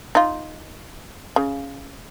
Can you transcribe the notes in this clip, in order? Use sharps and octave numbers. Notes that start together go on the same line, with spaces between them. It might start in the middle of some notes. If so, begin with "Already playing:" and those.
D#4 F4
C#3